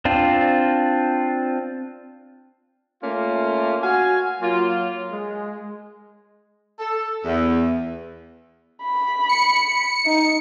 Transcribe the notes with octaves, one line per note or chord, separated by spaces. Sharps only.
C4 D4 F4
A3 A#3 C#4 F4
F#4 F5 G#5
F#3 A#3 F4
G#3
A4
E2
B5
C#7
D#4